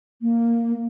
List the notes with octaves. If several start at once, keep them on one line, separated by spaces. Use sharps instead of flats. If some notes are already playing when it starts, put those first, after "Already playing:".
A#3